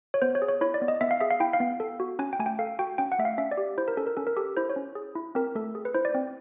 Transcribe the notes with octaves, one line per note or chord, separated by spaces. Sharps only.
C#5
B3 C5
C#5
G#4
C#5
E4 C#5
D5
B3
D#5
B3 E5
F5
G#4 E5
F5
E4 G5
F5
B3
A4
F#4
C#4 G#5
G5
A3 G#5
G5
A4 F5
F#4 G5
C#4 G5
F#5
A3 E5
F5
C#4 E5
D5
G4
E4 C5
A#4
C#4 A4
A#4
C#4 A4
A#4
G4 A4
E4 C5
C#5
C#4
G#4
E4
C4 A#4
A3 A4
G#4
B4
E4 C5
D5
C4